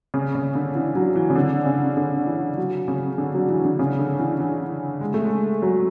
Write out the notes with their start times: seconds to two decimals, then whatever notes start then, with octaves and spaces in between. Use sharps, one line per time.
0.14 C#3
0.35 C#3
0.55 D3
0.75 E3
0.95 F#3
1.16 E3
1.30 C#3
1.35 D3
1.66 C#3
1.97 D3
2.27 E3
2.57 F#3
2.88 C#3
3.18 D3
3.34 F#3
3.49 E3
3.65 D3
3.79 C#3
3.99 D3
4.19 E3
4.40 E3
5.01 G#3
5.14 A3
5.25 G#3
5.62 F#3